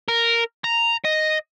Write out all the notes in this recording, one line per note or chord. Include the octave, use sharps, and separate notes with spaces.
A#4
A#5
D#5